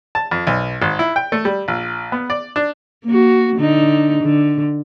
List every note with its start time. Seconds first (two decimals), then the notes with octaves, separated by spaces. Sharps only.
0.15 A5
0.31 F2
0.47 B1
0.82 G#1
0.99 E4
1.16 G5
1.32 A3
1.45 G3
1.68 A#1
2.12 B3
2.30 D5
2.56 D4
3.05 A#3 F#4
3.56 D3 D#4
4.23 D3